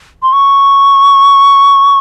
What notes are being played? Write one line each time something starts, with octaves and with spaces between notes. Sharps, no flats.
C6
C#6